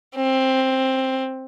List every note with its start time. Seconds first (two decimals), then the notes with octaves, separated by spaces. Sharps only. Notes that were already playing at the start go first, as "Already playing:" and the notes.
0.16 C4